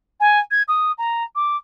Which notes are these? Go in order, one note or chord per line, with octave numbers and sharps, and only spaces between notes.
G#5
G#6
D#6
A#5
D6